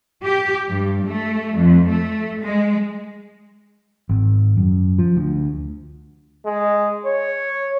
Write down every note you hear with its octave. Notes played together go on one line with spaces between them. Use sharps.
G4
G2
A3
F2
A3
G#3
G#1
F#2
F3
D2
G#3
C#5